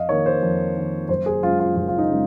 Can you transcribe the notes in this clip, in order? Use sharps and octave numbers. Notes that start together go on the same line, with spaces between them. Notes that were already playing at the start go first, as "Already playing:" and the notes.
Already playing: F2 D#5 F5
D#3 A#3 C#5
C5
F2
D#3 A#3
F#1 C5
G#4
F#2 C#3 G#3 F4
F4
F#1 F4
F4
D#4
C#3 G#3